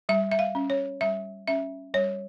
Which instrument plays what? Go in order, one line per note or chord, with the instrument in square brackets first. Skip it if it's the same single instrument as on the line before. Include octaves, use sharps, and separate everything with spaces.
[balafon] G3 E5
E5
F5
C#4
C#5
G3 E5
C#4 E5
G3 C#5